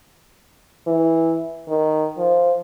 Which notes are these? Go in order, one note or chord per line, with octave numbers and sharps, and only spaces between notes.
E3
D#3
F3